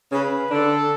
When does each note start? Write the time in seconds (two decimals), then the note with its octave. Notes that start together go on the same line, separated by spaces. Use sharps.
0.12 C#3 C#4 B4
0.51 D3 D4 A4